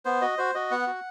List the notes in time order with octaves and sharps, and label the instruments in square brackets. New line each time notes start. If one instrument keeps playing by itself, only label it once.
[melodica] B3 C5
F#4 D#5
F#4 C5
F#4 D#5
B3 F#5
F#4